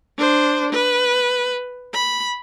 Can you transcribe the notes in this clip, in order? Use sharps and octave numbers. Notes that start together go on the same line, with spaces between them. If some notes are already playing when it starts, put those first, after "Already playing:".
D4 C5
B4
B5